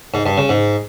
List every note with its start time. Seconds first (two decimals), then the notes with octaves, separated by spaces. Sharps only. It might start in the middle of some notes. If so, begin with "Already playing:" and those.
0.14 G#2
0.26 G2
0.38 C#3
0.49 G#2